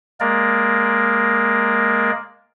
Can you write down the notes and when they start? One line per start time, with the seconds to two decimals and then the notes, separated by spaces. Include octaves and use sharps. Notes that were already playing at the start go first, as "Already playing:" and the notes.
0.20 G#3 A#3 A#4 D5